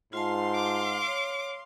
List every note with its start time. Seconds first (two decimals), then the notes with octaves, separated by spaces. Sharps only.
0.13 G#2 F4 F5 A5 C6
0.54 D6
1.07 C#5